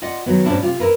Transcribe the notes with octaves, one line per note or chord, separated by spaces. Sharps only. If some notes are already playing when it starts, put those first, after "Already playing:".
F4 D5 D#5 F#5
D#3 F#3 G#3 B3
G#2 B2 D#3 C#4 D4 E4
C3 F4
E4 A#4 B4